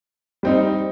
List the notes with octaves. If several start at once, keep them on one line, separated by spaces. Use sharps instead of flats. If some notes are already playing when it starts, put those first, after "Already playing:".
G3 C4 D#4